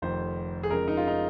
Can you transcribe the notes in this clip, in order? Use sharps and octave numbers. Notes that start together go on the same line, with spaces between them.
F1 F2 D#3 C5
G#4
F2 C#3 G#3 A#4
D#4
F4
D#4